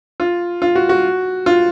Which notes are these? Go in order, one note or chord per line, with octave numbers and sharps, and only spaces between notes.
F4
F4
F#4
F#4
F4